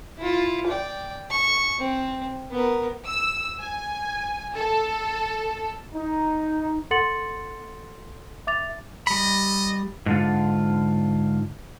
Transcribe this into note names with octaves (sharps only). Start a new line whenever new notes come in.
E4 F4
D5 G5
C#6
C4
B3 A#4
E6
G#5
A4
D#4
A4 F#5 C6 A6 C#7 F#7
E5 D6 A6 F7
G3 D#5 B5
G#2 D3 F4